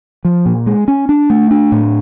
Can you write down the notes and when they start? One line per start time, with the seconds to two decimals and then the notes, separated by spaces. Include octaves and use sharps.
0.25 F3
0.46 A#2
0.66 G#3
0.88 C#4
1.09 D4
1.30 A3
1.51 D4
1.72 A2